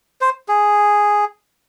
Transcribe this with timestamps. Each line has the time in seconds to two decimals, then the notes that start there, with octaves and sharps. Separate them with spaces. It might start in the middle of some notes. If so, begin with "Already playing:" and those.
0.21 C5
0.48 G#4